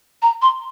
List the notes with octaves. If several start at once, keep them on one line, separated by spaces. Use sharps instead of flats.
A#5
C6